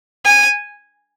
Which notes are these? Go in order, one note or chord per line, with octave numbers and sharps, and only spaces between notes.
G#5